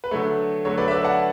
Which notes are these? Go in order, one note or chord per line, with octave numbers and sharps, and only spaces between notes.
B4
D3 F#3 A3 C#5
D3 F#3 A3 C#5
B4 D5
E5
B4 D5
F#5 A5